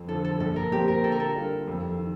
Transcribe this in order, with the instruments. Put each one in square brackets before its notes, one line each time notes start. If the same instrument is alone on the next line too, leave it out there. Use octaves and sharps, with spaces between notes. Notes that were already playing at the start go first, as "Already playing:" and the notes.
Already playing: [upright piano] F2
[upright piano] D3 F3 [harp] A4
[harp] A4
[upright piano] A#1 [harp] A4
[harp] A#4
[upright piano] A#2 F3 C4 [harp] G4
[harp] A#4
[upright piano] D3 [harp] A4
[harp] A#4
A4
[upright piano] G3 D4 F4 A#4
F2
D#3